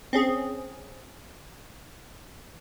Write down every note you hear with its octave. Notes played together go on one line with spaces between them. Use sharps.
C4 C#4 G#4